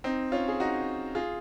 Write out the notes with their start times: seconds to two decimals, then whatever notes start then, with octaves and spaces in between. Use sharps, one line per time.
0.04 C4 D#4
0.32 C#4 F4
0.48 G#4
0.60 D#4 F#4
1.15 F4 G#4